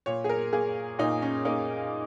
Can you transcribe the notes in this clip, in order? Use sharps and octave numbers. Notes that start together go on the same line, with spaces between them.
A#2 C#5
G#4
A#4
A#3 G#4
A#2 D#4
C#4
A#3 D#4